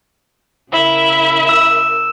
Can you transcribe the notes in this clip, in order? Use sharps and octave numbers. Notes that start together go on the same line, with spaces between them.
C#3 E4 A#4 E5
E6 E7